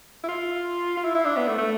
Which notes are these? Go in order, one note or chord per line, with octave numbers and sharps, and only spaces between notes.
E4
F4
F4
E4
E4
D4
B3
A3
A3